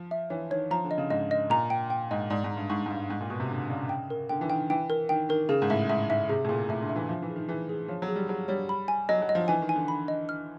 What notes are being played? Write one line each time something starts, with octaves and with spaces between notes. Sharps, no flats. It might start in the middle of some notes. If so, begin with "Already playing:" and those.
Already playing: F3
E5
E3 C#5
D#3 C#5
F3 A#5
D3
D#5
C#3
G#2 D#5
D#5
A#2 A#5
G5
G5
G#2 D#5
G#2 D5
G#2
A#5
G2
G#2 C#6
G#2
G2 F5
G#2 C#6
A#2
B2 C#6
C3
D3 A#5
C#3 D5
G5
A#4
D3 G5
E3
D#3 G5
E3 G5
A#4
D#3 G5
D#3 A#4
C#3 G#4
G#2
A2 E5
G#2 E5
G#2 E5
C3 G#4
A2
A#2 G#4
A2 E5
D3
E5
E3
F3 E5
E3
G#4
D#3
E3 G#4
G#4
F3 C#5
F#3
G#4
G3
F#3 G#4
G3 C#5
B5
G#5
F#3 D#5
F#3
D#5
F3
E3 G#5
D#3
G#5
D3
B5
D#5
F6